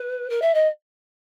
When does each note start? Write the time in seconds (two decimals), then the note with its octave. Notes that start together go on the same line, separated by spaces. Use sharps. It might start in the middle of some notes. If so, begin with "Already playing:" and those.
Already playing: B4
0.29 A#4
0.42 E5
0.54 D#5